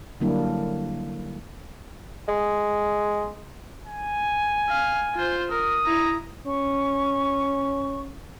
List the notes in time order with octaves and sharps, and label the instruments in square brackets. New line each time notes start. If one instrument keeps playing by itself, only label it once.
[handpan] D3 F#3 G3 A#3 D4 E4
[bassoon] G#3
[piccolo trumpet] G#5
[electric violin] F5
F4 C5
[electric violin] A#4 [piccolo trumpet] D#6
[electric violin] E4 A#5
[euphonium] C#4 [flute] C#6